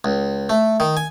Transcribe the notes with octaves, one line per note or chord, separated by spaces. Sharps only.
C#2
A3
D#3
G#5